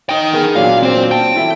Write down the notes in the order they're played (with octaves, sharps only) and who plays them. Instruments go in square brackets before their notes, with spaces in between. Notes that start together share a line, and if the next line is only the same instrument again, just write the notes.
[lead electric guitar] D#4 G5 [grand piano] D#5
[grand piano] B3 G#4 A#4
[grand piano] A#2 F#3 D4 [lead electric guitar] F5
[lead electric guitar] C4 C5
[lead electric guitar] G5 [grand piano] A5
[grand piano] E3 E4 A4